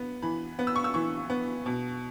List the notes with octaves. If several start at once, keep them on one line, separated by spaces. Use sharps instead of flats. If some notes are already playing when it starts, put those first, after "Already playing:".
Already playing: B3
E3 B5
B3
E6
C#6
E6
E3 C#6
B3
B2